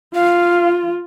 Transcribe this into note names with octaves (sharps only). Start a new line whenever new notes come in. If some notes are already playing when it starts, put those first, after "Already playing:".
F4 F5